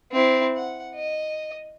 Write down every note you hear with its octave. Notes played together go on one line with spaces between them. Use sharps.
C4 E4
F#5
D#5